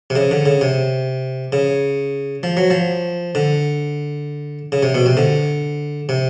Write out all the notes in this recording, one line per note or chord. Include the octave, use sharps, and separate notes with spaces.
C3
C#3
D3
C#3
C3
C#3
F3
F#3
F3
D3
C#3
C3
B2
C3
D3
C3